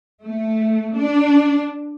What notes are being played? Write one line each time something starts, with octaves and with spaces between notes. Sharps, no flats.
A3
D4